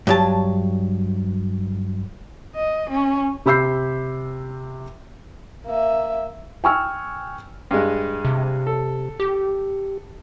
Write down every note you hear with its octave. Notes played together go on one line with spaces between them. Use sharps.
G2 F#3 A5
D#5
C#4
C3 G4 B5 E6 G6 C7
A#3 E5
G5 G#5 C#6 E6 F6
G2 G#3
C3
A4
G4